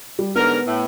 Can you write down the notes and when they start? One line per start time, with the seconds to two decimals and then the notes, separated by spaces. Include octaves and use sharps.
0.19 G3
0.36 G#2 D3 B3 A#4
0.66 A2